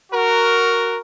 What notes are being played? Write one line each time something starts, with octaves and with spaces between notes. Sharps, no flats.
F#4 A#4